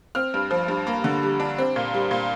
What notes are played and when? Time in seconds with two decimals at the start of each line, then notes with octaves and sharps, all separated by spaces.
0.15 C4 F6
0.34 G2
0.51 F3
0.68 G2
0.87 A#3
1.04 D3
1.23 G3
1.40 D4
1.58 C4
1.76 A#2
1.94 G3
2.11 A#2